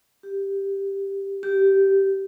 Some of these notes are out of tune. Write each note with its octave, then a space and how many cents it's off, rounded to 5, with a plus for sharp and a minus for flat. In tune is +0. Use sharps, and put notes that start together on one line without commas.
G4 +5
G4 -10